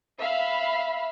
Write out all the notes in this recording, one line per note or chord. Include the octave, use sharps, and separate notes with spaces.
E5 F5 B5